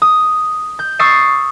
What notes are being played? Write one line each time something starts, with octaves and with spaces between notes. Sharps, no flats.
D#6
G6
C#6 D#6 E6 A6 C7 D#7